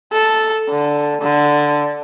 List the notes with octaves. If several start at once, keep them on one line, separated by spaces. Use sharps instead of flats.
A4
D3
D3